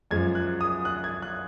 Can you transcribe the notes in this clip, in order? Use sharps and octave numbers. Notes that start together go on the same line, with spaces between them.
F#2 F3 G#3 G#6
F#6
D#6
F#6
G#6
F#6